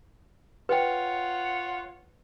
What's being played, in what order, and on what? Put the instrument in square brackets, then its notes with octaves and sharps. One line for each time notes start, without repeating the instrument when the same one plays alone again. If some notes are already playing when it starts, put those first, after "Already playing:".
[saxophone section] F4 C#5 F#5 [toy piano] B4 G5